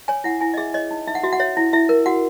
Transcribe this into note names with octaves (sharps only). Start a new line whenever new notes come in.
C#5 G#5
E4 F#5
E4 G#5
D#5
G#4 E5
C#5 D#5
D#4
D#4 E5
F#5
F#4 E5
F#5
C#5 E5
E4
E4 E5
A#4
F#4 F#5